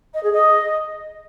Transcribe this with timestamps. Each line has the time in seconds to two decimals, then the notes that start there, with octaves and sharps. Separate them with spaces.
0.13 D#5
0.23 G#4
0.32 D#5